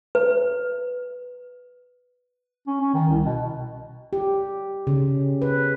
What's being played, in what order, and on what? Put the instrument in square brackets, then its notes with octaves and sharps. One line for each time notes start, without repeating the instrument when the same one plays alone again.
[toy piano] B4
[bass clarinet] C#4
C#4
D#3
C2
B2
[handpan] G4
C#3
B4